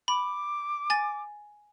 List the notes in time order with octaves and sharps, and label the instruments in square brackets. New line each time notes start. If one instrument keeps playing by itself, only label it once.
[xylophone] B5 [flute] D6
[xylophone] G#5 A6